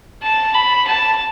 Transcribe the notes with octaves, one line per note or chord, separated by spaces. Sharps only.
A5
B5
A5